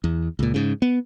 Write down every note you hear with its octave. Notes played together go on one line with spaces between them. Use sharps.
E2
C#2 A#2
G#2 C#3
B3